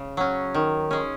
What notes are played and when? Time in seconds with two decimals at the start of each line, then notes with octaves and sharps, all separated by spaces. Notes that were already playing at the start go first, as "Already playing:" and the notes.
Already playing: C#3
0.17 F#3 C#4
0.54 D#3
0.91 G#3 C#4